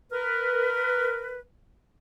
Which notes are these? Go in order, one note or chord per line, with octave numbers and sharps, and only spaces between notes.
A#4 B4